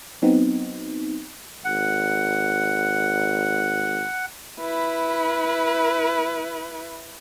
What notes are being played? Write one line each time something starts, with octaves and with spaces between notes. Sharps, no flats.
F#3 B3 C4 D#4
G#1 F#5
E4 B4